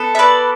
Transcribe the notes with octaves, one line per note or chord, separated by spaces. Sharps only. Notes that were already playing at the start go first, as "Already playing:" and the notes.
Already playing: B3 A4
E5
B4 D5